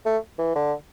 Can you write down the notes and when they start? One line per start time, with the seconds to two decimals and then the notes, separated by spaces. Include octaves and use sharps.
0.06 A3
0.39 E3
0.55 D3